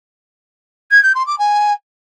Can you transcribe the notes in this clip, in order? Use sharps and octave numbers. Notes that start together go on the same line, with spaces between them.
G#6
G6
C6
D6
G#5